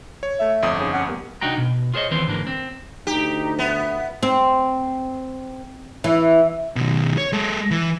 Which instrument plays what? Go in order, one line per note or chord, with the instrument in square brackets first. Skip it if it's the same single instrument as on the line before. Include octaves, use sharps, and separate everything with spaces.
[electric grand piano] C#5
[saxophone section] A3 E5
[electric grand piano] G1 F2 D#6
[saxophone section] C#3 C#4 D#4
C#4 F#5
G3 A#3 B3
[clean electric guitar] C2 D4 D#4 F#4 G5 A#5
B2
F4 G#4 C5 C#5 D#5
D#2 E3 B3 C4 E4 C5
G#2 D3 E3 A#3
C4
[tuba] D2 [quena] D#4 [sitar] G4
[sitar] B3 [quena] E5
[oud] C4
E3
[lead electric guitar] B2 D#3
C#5
G#3 A4
E3